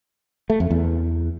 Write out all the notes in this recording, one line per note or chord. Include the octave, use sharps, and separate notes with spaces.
A3
F2
E2